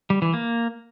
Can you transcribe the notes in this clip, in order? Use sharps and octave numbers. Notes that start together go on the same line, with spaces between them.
G3
E3
A#3